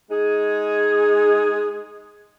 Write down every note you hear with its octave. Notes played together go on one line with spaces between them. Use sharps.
G#3 D#4 G#4